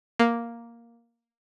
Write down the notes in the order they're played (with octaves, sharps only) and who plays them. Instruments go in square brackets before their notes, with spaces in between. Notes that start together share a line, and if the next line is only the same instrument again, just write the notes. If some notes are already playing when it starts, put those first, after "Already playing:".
[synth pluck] A#3